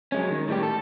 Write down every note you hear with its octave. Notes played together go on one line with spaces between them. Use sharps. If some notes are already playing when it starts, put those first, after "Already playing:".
F#3 G#3 C#4
D#3
A2 G3 G4
A4